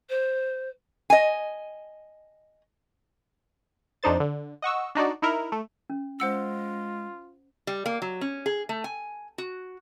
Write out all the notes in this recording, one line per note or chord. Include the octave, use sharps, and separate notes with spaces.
C5
D#5 G#5
F2 D4 D#4 C5 A6
D3
D#5 F#5 C#6 E6
D4 D#4 F#4 D5
D#4 E4 A#4
A3
C#4
G#3 F4 C5 F#5 E6
G3
A#3
F#3
C#4
G#4
A3
G#5
F#4